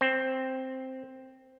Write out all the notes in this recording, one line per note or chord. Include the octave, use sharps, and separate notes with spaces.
C4